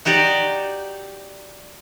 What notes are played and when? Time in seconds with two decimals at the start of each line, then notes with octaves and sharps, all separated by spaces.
0.05 D#4 F#4 G4 D5